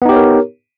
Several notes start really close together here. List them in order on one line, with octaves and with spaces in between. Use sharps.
B3 D#4 G4 C#5 A#4